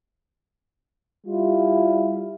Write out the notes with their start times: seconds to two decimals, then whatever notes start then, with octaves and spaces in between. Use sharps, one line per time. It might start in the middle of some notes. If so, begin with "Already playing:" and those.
1.27 G3 E4 F4